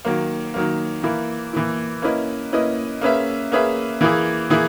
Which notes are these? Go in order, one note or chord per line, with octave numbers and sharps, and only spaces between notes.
D#3 F#3 A#3
D#3 F#3 A#3
E3 A#3 E4
E3 A#3 E4
A#3 C#4 E4 B4 D#5
A#3 C#4 E4 B4 D#5
A#3 C#4 G#4 B4 E5
A#3 C#4 G#4 B4 E5
E3 A#3 E4 G#4
E3 A#3 E4 G#4